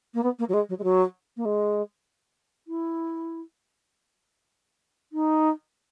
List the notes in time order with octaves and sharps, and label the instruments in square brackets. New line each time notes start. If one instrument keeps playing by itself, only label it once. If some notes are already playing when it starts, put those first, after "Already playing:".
[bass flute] A#3
B3
A#3
F#3
G#3
F#3
G#3
F#3
A#3
G#3
E4
D#4